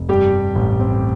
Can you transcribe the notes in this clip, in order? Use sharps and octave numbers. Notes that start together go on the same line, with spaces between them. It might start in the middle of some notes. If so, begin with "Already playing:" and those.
Already playing: F1
G2 G3 G4
G3
A1
C4